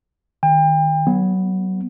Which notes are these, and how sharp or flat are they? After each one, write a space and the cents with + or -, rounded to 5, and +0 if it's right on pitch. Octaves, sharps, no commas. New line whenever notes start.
D#3 +0 G5 +35
F#3 +25 B3 -5